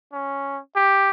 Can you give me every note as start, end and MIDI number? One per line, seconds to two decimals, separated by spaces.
0.13 0.59 61
0.76 1.11 67